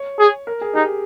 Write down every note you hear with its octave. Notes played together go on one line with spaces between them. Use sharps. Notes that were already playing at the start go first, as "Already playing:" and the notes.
Already playing: C#5
G#4
A#4
G#4
D#4 G4